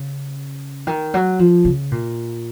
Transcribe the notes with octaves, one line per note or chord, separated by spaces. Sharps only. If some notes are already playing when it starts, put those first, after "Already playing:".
Already playing: C#3
D#3
F#3
F3
C#3
A#2